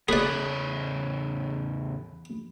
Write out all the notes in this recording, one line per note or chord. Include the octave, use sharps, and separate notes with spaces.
E2 C#3 G#4 C#5 D5 B5 F#6